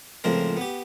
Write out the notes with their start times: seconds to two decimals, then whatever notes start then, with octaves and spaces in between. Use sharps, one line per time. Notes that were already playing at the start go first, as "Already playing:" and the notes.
0.24 C#2 A2 F3 C4 A#4
0.57 B3 G4